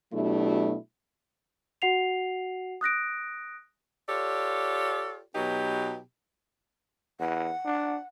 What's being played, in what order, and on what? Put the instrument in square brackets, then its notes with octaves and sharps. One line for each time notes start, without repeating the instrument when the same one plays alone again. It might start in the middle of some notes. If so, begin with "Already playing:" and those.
[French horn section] B2 F#3 A3 D4 E4 G4
[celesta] F#4 F#5 C7 F7
D#6 F#6 A#6 D7
[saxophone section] F4 G4 A4 C#5 D5
B2 F#3 B3 D#4 G4
[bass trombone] E2 [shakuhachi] F#5
[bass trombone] D4